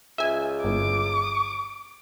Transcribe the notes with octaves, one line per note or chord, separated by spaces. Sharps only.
C#2 E5 G#5
G1 D6